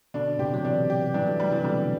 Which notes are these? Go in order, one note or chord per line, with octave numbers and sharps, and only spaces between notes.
B2 D3 D4
A2 C3 G4
F#3
C3 E3 D4
G4
E3 G3 D4
F#3 A3
G3
C3 E3
B2 D3 G3